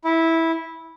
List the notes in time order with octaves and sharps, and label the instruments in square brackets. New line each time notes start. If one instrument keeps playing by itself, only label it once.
[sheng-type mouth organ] E4